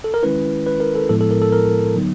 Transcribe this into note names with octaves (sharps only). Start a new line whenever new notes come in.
A4
A#4
D#3 G#3 C#4 E4 B4
B4
A#4
A4
A2 F3 G#3 B3 E4 A4
A4
A#4
A4
A#4
D3 F#3 B3 D#4